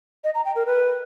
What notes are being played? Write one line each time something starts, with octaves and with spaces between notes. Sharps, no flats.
D#5
A#5
G5
A#4
B4